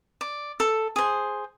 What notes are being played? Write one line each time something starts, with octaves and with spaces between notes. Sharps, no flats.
D5
A4
G#4 C5